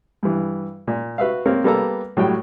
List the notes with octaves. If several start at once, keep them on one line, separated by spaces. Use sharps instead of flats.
G2 E3
A#2
F#4 B4 E5 F5
A#3 C4 C#5
G3 A#3 B3 A4 B4 A#5
A2 F#3 G3 G5